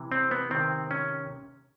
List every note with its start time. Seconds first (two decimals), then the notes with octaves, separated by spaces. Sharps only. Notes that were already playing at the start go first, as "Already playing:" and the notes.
Already playing: C3 E3
0.12 C4
0.31 B3
0.51 C3 D#3 C4
0.91 C#4